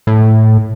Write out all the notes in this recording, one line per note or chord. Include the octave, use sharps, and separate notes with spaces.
A2